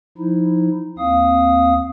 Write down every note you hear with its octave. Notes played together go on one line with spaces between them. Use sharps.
F3 D#4 E4
D#2 C4 F5 D#6